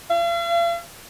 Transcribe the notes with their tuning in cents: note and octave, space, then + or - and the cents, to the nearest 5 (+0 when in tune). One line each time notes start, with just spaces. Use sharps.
F5 -45